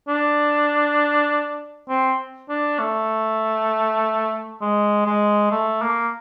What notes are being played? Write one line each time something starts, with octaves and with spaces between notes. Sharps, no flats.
D4
C4
D4
A3
G#3
G#3
A3
A#3